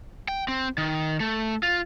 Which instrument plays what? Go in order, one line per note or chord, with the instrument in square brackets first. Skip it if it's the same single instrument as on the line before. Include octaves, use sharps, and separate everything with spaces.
[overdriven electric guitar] G5
C4
D#3
A3
F4